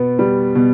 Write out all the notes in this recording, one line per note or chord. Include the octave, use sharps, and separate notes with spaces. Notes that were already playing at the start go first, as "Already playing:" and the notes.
Already playing: B2 B3
G3
B2